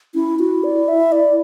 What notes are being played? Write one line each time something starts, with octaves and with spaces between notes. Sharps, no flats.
C#4 E4
E4 F#4
D5
E5
D5